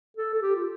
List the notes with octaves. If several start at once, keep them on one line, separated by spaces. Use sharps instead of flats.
A4
A4
G4
F4